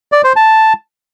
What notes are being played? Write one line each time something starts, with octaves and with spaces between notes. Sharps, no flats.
D5
C5
A5